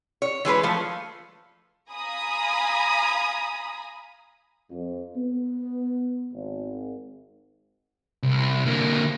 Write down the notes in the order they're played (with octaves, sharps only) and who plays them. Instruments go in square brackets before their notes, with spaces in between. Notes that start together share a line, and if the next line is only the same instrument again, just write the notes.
[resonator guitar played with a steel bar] C#5
E3 G#3 G#4 B4
F3 A3
[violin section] F5 G#5 A#5 B5 D#6
[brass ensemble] F2
B3
G#1
[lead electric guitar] C2
D3 A#3